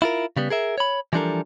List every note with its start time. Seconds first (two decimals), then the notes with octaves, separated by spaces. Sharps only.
0.02 E4 F4 A#4
0.36 C#3 G3 B3
0.50 G#4 A#4 E5
0.78 C#5 B5
1.13 E3 F3 G3 D4 A4 A#4